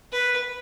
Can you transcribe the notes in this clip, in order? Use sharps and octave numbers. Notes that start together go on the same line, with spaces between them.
B4